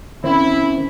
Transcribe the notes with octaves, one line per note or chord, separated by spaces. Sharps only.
D#3 C4 C#4 E4